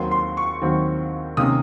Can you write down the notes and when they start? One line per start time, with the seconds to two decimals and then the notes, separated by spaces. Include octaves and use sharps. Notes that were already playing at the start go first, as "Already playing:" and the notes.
Already playing: D#2 D#3 F#3 C4 C6
0.11 C6
0.37 C#6
0.62 D#2 D#3 F#3 C4
1.37 C3 D#3 A#3 C#4 D#6